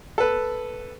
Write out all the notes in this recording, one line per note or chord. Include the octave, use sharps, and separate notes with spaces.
A4 B4